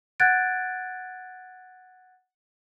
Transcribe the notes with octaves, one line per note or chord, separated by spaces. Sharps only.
F#5 F#6 G#6 A6 D7